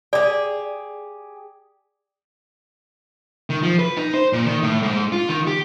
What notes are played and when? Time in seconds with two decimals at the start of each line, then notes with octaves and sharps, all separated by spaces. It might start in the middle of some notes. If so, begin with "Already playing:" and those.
0.13 G4 G#4 D5
3.50 D#3
3.63 F3
3.79 B4
3.97 D#4
4.14 C5
4.33 A#2
4.46 D#3
4.63 A2
4.83 G#2
5.12 F4
5.28 D#3
5.47 G4